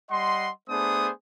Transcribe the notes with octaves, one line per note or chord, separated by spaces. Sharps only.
G3 D#5 F#5 C6
A3 B3 D4 G#4 C5 D#6